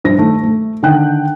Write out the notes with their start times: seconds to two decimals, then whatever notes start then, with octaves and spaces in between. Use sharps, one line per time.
0.04 G2 F3 C5 A#6
0.17 D#3 A3
0.43 A3
0.83 D3 D#3 G5 F#6